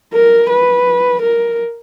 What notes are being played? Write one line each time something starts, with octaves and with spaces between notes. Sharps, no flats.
A#4
B4
A#4